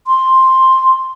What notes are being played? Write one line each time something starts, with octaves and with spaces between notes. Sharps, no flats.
C6